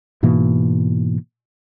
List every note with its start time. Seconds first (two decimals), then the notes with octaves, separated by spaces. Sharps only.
0.23 G#2 B2 E3 A#3